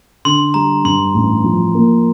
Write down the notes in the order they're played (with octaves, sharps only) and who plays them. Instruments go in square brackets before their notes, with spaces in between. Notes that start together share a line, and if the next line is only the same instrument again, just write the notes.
[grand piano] D3 [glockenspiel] C6
[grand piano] G3 [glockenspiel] A#5
[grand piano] G2 [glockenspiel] C6
[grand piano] A1
F3
A#3